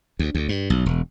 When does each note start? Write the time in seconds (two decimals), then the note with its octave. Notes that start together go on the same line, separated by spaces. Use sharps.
0.19 D2
0.35 D2
0.49 G2
0.70 B1
0.86 E1